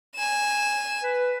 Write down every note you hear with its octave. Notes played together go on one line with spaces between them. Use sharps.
G#5 E7
B4